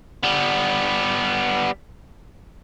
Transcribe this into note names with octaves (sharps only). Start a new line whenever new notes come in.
G3 B3